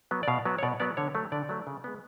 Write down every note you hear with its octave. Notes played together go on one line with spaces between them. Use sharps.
F#3 B3
D5
B2 F5
F#3 B3
C#5
B2 D5
F#3 B3 D5
D3 C#5
F#3 A3
D3 D5
F#3 A3
C#3
G#3 B3